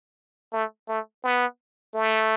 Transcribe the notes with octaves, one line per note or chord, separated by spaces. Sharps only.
A3
A3
B3
A3